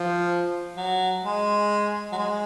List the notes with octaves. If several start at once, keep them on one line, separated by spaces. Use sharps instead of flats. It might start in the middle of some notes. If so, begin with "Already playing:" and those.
Already playing: F3
F#3
G#3
F#3
G#3